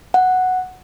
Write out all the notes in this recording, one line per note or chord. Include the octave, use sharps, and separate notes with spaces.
F#5